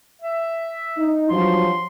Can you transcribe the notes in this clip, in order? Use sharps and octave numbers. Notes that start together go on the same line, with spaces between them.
E5
D#4
G2 F3 F#3 C6